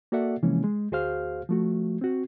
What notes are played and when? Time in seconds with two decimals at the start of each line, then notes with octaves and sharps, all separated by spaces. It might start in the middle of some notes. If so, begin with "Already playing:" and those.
0.12 A#3 F#4 A4 D5 E5 F#5
0.43 C3 E3 F3 G#3 A#3 C#4
0.64 G#3
0.92 D2 F#4 G#4 C5 F5 F6
1.49 F3 A3 F#4
2.01 C4 F#4